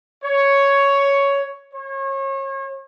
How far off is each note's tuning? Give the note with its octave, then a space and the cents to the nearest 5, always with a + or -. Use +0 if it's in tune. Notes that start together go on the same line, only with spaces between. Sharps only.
C#5 +5
C#5 -35